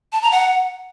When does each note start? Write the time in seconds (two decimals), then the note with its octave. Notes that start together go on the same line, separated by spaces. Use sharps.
0.13 A5
0.22 A#5
0.32 F#5